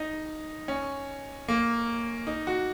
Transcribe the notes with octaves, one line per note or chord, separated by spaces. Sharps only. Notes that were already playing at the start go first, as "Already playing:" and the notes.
Already playing: D#4
C#4
A#3
D#4
F#4